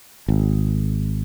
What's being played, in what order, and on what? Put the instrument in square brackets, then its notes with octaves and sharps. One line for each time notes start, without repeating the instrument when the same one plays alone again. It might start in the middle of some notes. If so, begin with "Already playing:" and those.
[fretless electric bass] G#1